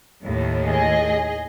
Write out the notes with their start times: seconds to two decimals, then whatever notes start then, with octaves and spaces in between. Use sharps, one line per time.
0.24 D#2 A2 D#3
0.65 G#4 D#5